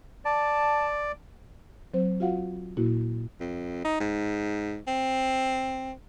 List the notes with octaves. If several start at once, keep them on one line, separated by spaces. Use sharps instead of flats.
D5 A5
F#3 C4 C5
F4 F#4 F5 F#5
A#2 A#3 E4 F#4
F2
D#4
G#2
C4